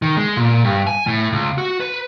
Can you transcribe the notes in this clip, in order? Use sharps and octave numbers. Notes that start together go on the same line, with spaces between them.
D#3
G#3
A#2
G2
G#5
A2
C#2
F#4
B4